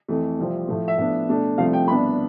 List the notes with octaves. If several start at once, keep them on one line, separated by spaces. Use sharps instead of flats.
F2 E3 A3
C2 C3 F3 C4
A2 F3 A3
E5
A2 F3 B3 D4 E5
B2 A3 D4
C2 C3 F3 A3 F5
G5
C2 B2 B3 D4 B5